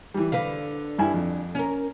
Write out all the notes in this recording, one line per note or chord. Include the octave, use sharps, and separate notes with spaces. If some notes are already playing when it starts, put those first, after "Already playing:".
E3 G3
D3 B4 F5
G2 E4 G#5
F2
C#4 A#4